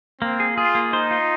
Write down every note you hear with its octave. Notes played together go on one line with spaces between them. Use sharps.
A#3 C4
G#4
F4 G#4
A#3
D#4 C5
F4